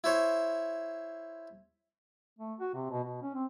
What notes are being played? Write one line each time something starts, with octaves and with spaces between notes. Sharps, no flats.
E4 C5 C#5
A3
F#4
C3
B2
B2
C#4
C4